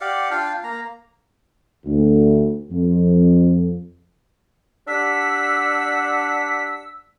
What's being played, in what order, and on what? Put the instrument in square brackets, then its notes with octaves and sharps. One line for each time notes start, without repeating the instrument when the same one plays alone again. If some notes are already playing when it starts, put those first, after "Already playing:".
[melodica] G4 D5 F5 F#5
D4 F4 F5 G5
A#3 A#5
[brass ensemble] D2
F2
[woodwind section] D4 G4 F#5 [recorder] E6 [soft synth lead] B6